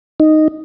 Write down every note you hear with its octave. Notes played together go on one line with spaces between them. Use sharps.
D#4